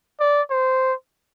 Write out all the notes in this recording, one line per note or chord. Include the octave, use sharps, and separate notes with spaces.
D5
C5